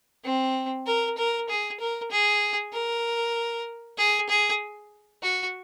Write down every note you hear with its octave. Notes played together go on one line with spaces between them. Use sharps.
C4
A#4
A#4
G#4
A#4
G#4
A#4
G#4
G#4
F#4